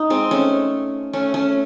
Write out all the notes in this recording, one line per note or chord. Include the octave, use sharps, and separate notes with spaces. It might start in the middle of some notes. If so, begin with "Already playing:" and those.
Already playing: D#4
G#3 C4
A3 C#4
A3 C#4
A3 C#4